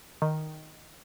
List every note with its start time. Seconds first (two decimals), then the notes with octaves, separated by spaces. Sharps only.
0.22 D#3